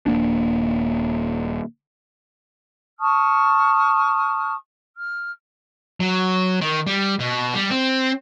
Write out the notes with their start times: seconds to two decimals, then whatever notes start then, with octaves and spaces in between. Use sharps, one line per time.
0.06 D#1 A#3 D4
2.99 A5 C#6 D#6 F6
4.95 F6
6.00 F#3
6.61 D#3
6.87 G3
7.19 B2
7.54 G3
7.70 C4